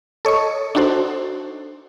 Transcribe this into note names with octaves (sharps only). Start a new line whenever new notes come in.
A4 C#5 D#5 C#6
D4 D#4 F#4 A4 C5